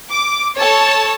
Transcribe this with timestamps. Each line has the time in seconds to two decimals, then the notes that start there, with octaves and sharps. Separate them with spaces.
0.11 D6
0.58 A4 C#5 A5